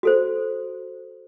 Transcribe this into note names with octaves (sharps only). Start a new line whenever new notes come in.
F#4 A4 C5